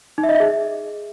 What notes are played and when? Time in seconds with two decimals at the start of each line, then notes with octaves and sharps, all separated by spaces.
0.18 D#4
0.23 E5
0.29 D#5
0.35 E5
0.40 G#4